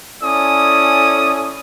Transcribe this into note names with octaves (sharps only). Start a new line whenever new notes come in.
C#4 E4 A4 D5 G#5 D#6